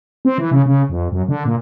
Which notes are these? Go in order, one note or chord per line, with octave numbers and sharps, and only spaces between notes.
C4
E3
C#3
C#3
F2
F#2
D3
A#2